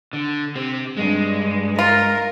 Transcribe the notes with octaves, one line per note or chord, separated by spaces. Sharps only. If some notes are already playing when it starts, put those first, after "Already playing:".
D3
C3 C4
G2 G#3
F4 A#4